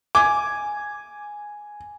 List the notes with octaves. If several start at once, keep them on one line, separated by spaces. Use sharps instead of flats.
G#5 D6